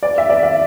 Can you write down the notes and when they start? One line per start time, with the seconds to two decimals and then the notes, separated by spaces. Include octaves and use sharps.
0.03 D5
0.18 E5
0.30 D5
0.43 E5